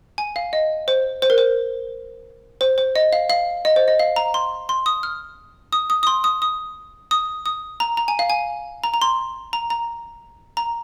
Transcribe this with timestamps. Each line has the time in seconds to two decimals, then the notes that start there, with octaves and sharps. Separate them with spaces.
0.18 G#5
0.36 F5
0.53 D#5
0.88 C5
1.22 C5
1.30 A#4
1.38 C5
2.61 C5
2.78 C5
2.96 D#5
3.13 F5
3.30 F5
3.65 D#5
3.76 C5
3.88 D#5
4.00 F5
4.16 A#5
4.34 C6
4.69 C6
4.86 D#6
5.03 F6
5.73 D#6
5.90 D#6
6.03 D#6
6.07 C6
6.24 D#6
6.42 D#6
7.11 D#6
7.46 D#6
7.80 A#5
7.97 A#5
8.08 G#5
8.19 F5
8.30 G#5
8.84 A#5
8.94 A#5
9.02 C6
9.53 A#5
9.70 A#5
10.57 A#5